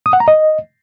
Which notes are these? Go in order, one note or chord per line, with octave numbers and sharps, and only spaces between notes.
D#6
F#5
A#5
D#5